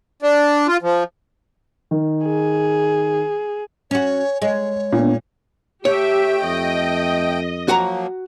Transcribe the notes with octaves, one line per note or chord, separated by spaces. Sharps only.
D4
F4
F3
D#3
G#4
C#4 F#4 C#5 G#5
G#3 C#5
A#2 B3 D4
A3 G4 C#5 E5 G5
F2 D#5
F3 F#3 A#3 F#4 F#5 A#5